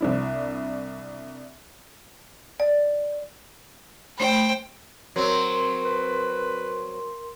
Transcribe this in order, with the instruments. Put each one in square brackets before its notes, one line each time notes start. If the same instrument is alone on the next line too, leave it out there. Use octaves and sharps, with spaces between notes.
[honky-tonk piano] C2 D4 E4
[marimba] D5
[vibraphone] A3 B5 [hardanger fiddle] C5 G5
[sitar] F#3 C4 [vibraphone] A#4 C6
[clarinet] B4